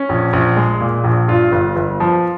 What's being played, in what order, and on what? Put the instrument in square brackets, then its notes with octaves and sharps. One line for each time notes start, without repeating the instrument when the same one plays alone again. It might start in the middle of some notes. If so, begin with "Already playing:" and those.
Already playing: [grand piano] C#4
A#1
A#1
G#3
A#2
A#1
G2 F4
G1
G1
F3